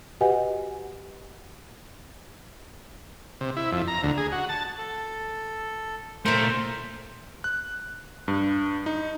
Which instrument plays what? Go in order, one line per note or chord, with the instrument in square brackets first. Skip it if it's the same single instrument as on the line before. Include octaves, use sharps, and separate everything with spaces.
[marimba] F#4 G4 B4 D#5 F#5 G#5
[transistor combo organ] C3
E4
F2
A#5
D2
G#4
F#4
A5
[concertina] A4
[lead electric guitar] A#2 A3 [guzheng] A#4 E5 [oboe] C5
[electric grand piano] F#6
G2
D#4